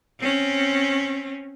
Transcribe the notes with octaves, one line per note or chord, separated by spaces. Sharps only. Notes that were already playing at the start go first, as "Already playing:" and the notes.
C4 C#4